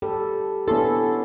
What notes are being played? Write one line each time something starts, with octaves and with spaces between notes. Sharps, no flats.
G3 A4
B3 C#4 D4 E4 A4 C6